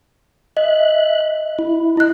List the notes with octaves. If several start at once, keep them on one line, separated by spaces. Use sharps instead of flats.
D#5 E5 F#6
E4
E4 D#5 F#6